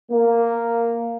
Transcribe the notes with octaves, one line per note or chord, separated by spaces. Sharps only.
A#3